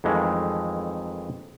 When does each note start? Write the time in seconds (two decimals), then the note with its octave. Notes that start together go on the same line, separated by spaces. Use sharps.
0.04 F2 D#3 E3 G#3 A3